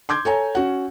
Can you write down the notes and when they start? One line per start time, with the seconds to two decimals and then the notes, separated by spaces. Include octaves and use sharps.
0.09 C6 D6 G6 G#6
0.25 A4 C#5 G#5 A#5
0.55 C#4 F#4 F#5